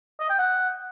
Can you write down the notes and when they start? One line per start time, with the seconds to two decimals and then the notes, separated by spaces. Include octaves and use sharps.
0.20 D#5
0.30 G5
0.39 F#5